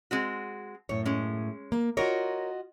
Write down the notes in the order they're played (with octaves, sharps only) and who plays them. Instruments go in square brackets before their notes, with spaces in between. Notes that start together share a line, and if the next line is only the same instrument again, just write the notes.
[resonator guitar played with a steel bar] G#3 C4 F#4
[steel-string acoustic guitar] F#2 A2 [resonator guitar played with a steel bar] C#5
[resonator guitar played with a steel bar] G#3 C#4
[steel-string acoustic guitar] A#3
[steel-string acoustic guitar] F4 F#4 D#5 [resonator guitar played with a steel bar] A#4 C#5